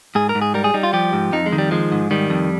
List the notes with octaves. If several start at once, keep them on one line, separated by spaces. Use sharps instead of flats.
G#2 G#4
A#4
G#2
G#4
G3 A#4
G#4
G3 D#4
F4
F3 G4
G#2
F2 D#4
G#3
D#3
G3
F3 G#3
G#2
D#3 G3
F2